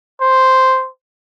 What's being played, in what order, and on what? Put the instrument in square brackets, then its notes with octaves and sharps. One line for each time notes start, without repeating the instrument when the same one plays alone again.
[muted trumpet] C5